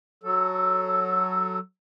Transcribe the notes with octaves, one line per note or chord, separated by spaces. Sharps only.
F#3 A4